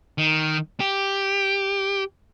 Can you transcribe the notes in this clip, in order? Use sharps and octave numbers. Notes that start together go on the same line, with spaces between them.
D#3
G4